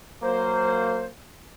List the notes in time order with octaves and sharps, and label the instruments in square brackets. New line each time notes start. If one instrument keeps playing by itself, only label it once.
[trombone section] F#3 A#3 [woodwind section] C5